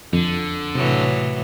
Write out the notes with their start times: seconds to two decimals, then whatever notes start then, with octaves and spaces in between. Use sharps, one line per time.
0.13 F2 D3
0.75 A2 C3 E3 F#3